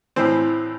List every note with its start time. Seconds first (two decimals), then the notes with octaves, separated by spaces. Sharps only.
0.16 A2 E3 C4